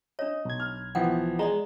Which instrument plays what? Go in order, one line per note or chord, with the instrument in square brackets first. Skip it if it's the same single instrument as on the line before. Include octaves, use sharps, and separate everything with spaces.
[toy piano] D4 C#5 [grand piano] D#5
[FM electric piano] B1 G#6
[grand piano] F6
[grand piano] E3 F3 B3 [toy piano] F#5 G5
[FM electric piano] G#3 [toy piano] D5 D#5 A#5